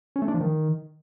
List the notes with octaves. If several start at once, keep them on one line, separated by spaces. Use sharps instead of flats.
C#4
A3
D4
F3
D#3